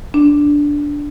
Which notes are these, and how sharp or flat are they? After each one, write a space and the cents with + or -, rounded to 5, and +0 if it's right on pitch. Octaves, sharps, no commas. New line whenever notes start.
D4 -10